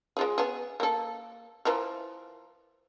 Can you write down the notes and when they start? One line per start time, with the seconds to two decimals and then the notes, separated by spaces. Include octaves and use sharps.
0.17 G#3 F4 G#4
0.38 B3 G#4
0.80 A#3 A4
1.65 E3 F3 A#4